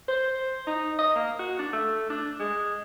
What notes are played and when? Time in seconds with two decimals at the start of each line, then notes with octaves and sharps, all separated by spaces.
0.08 C5
0.67 D#4
0.99 D#5
1.16 A#3
1.39 F#4
1.59 D4
1.73 A3
2.10 D4
2.39 G#3